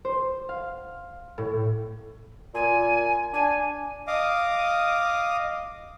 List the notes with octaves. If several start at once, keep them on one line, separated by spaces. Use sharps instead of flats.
C5
F5
A2
A#2 G#5
D4 G#5
D#5 F5 D6 D#6